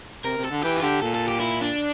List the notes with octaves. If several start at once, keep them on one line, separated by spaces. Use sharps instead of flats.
C3 A#4
C3
A4
D3
E3 G4
F4
D3 G4
A#2 A4
A4
G4
E4
D4